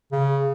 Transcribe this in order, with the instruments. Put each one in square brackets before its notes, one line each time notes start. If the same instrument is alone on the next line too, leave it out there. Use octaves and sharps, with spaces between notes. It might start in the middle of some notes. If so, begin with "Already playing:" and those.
[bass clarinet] C#3